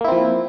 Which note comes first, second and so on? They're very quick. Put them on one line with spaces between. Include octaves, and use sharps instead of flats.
A#3 E4 C4 F3